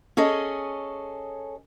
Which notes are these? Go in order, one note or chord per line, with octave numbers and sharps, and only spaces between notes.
C#4 G#4 A4 C#5 D#5